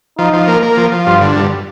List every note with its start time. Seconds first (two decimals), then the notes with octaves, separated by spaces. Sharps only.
0.18 F3 D#4
0.33 F3
0.48 A#3
0.62 A#3
0.77 F3
0.92 F3
1.07 G2 F4
1.21 D3
1.36 G2